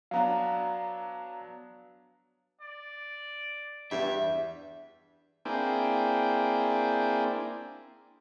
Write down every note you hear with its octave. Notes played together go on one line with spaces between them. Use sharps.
F#3 B3 D4 F5 A#5
D5
E2 G2 E5
A#3 C4 D4 E4 G#4 G5